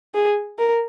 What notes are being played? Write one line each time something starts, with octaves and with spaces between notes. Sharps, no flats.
G#4
A#4